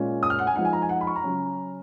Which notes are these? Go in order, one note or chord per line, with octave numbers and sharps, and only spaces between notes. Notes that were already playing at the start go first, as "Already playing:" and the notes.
Already playing: A#2 G#3 C#4
D#6
F6
F#5
G#5
F3 G#3 D#4 F#5
G#5
A#5
G#5
F#5
B5
C#6
A#5
C#3 F#3 C#4